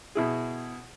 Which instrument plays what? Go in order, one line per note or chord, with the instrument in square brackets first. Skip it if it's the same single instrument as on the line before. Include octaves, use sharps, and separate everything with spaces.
[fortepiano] B2 E4 G#4